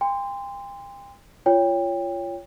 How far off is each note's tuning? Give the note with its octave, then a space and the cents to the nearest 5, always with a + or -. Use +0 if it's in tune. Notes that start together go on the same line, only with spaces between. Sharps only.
G5 +40 C6 -15
F4 -20 C#5 +15 G5 +25